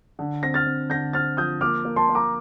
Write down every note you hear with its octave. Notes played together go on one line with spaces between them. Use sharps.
D3
C4 A#6
F6 A6
C4
D3 G6 A#6
C4 F6 A6
F3 D#6 G6
A#3 D6 F6
A#3
A5 C6
A#3
A#5 D6